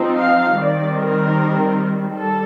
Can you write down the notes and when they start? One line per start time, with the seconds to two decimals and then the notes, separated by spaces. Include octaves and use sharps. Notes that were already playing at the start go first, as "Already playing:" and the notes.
Already playing: F3 C4 D#4
0.18 F5
0.57 D#3 G3 C4 D5
0.97 A#4
2.15 G3 A4